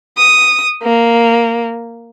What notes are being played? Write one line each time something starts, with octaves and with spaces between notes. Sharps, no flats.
D#6
A#3